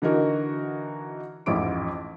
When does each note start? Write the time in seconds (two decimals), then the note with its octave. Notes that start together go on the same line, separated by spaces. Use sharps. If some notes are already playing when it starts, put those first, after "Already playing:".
0.02 D3 E3 D#4 F#4 A#4
1.46 A1 F2 G#2 E4 D6 D7